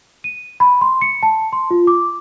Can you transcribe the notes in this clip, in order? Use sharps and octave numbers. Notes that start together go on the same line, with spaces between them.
D#7
B5
C6
C#7
A5
C6
F4
D6